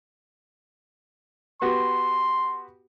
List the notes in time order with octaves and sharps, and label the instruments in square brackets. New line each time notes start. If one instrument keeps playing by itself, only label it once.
[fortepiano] B3 F#4 G4 [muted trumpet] C6